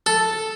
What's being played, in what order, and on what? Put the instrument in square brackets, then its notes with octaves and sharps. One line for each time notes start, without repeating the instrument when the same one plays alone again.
[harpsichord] A4